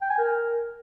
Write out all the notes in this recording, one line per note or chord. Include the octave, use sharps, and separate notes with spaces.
G5
G#5
A#4